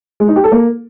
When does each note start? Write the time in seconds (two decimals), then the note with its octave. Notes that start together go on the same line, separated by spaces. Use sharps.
0.20 G#3
0.28 D#4
0.36 G4
0.44 A4
0.52 A#3